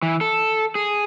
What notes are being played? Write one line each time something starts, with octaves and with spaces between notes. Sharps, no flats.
E3
A4
G#4